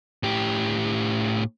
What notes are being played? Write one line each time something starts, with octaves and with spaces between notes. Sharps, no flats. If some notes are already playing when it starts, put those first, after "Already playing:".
A2 G4